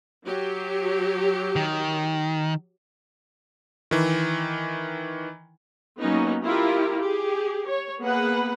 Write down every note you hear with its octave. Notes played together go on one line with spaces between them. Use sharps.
F#3 G4
D#3
D#3 E3
F#3 A#3 B3 C#4 D#4
E4 F4 G4 A#4
G4 G#4
C#5
A#3 B3 G#4 B4 F#5